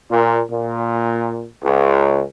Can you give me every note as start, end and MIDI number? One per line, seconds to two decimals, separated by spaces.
0.10 0.40 46
0.50 1.47 46
1.63 2.22 37